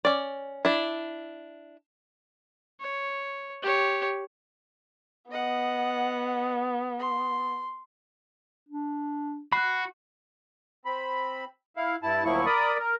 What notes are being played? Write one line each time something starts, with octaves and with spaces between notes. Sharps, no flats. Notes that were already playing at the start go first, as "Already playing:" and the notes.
C#4 D5
D4 E4
C#5
G4 C#5
B3 D#5 F#5
C6
D4
F#4 B5 F#6 C7
C4 B5
E4 F5
G2 E4 A5
D2 F3 F#3 A#3 E4 C#6
A#4 D5 B5 D#6
A#4